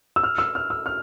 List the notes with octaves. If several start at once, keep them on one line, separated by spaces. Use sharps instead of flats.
E6
F6
E6
F6
E6
F6